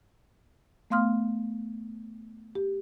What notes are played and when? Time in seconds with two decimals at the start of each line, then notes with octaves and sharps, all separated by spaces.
0.90 A3 B3 F5 C6 D#6 F6
2.55 G4